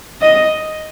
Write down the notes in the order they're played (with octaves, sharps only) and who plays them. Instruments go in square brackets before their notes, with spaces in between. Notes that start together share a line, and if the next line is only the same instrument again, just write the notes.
[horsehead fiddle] D#5